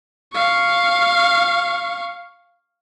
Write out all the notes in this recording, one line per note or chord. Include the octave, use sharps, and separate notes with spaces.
F5 C#6